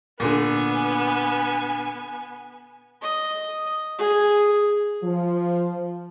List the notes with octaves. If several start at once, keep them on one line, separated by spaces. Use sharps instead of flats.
A#2 D3 B3 G#5
D#5
G#4
F3